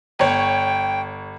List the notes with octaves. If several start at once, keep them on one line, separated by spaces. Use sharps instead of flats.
G1 C#5 G5